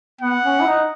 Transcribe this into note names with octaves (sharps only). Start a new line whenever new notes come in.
B3 F#5
C#4
E4
D#4